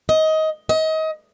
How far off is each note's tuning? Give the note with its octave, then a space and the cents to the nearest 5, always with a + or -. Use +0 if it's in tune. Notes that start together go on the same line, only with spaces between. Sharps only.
D#5 +20
D#5 +30